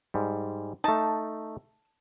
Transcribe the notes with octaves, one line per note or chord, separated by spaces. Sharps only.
G#2 G3
A3 D#4 A5